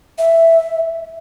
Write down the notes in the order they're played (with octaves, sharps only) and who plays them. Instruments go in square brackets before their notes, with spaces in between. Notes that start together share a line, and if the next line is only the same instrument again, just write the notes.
[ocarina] E5